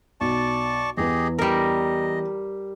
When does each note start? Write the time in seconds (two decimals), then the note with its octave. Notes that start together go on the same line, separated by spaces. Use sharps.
0.21 B1 D5 A5 C#6
0.97 E2 E3 B3 G4 G#4 D#5
1.39 G3 A#4 D#5